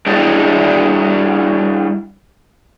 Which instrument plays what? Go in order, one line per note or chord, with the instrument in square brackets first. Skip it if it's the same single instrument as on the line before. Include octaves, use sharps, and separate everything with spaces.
[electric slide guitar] G3 D4 E4 G#4 D5 D#5